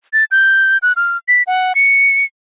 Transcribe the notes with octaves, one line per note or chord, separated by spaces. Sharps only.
A6
G6
F#6
F6
B6
F#5
C#7